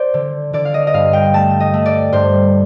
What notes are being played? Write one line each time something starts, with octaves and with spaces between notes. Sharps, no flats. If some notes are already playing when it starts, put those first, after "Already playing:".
Already playing: C5 D5
D3
D3 D5
F5
D#5
D#5
G2 F5
G5
A3 A5
D#5
A3
D5
G2 C5